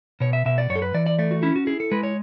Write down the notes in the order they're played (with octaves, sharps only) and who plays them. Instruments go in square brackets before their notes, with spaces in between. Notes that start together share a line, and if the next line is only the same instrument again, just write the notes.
[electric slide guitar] B2 C#5
E5
B2 E5
D5
F#2 C#5
A4
B4
E3 D5
D5
A3 D5
F#4
C#4 E4
F#4
E4 G#4
A4
G#3 B4
C#5